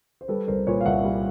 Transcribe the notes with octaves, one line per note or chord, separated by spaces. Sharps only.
C5
G3 A4 B4
C2 A#4 C5
A#2 B4 C#5
F5
C2 E5 F#5
G3